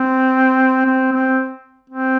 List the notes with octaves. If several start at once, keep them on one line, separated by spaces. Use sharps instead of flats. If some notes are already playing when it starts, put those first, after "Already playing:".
Already playing: C4
C4
C4
C4